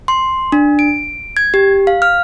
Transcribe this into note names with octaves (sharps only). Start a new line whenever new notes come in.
C6
D4
D7
G#6
G4
F5
F6